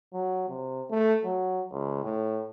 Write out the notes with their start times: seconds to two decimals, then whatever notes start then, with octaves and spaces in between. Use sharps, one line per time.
0.13 F#3
0.49 C3
0.90 A3
1.25 F#3
1.71 C#2
2.04 A2